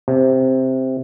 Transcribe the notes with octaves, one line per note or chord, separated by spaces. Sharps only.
C3